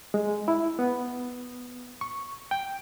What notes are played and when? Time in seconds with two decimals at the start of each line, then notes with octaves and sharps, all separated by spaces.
0.14 G#3
0.48 E4
0.79 B3
2.01 C#6
2.51 G5